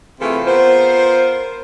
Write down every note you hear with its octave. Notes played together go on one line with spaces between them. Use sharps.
C3 E3 A3 F4 G#4 A4
B3 F4 A#4 C5